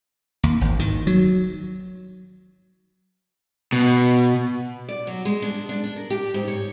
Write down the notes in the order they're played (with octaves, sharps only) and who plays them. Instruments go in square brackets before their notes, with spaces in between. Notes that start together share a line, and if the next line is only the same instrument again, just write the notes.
[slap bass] D#2
G#1
D#3
F#3
[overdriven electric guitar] B2
[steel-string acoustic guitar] D5
F#3
G#3
D4
D4
D4
A#4
G4
G#2
C#5